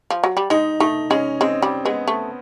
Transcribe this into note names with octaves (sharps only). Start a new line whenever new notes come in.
F3
F#3
G3
G#3 D#4
A3 D#4
G#3 C#4
G#3 C4
G3
G#3 B3
A3